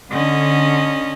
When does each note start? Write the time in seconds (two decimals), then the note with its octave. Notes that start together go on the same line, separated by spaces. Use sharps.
0.12 D3 C#4 D#5